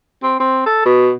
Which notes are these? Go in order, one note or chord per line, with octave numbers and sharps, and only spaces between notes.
C4
C4
A4
B2